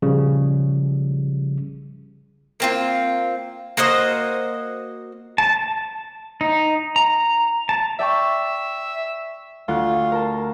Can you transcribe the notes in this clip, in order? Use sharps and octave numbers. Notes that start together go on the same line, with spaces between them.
A#1 C#3 F3 G3
A#3 C4 F4
A#3 F#4 C5 D#5
A5
D#4
A#5
A5
D5 E5 G5 C#6
D2 F4 F#6
A#4 A5